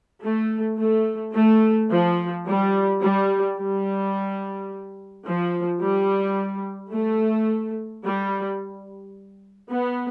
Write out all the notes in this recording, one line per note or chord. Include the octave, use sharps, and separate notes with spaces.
A3
A3
A3
F3
G3
G3
G3
F3
G3
A3
G3
B3